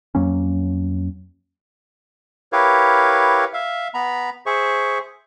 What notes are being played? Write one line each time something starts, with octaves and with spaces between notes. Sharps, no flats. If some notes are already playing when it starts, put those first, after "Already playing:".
F2 F#3 A#3 C#4
E4 G4 A#4 B4 C#5 F5
E5 F5
B3 A#5 B5
G#4 C5 E5 C#6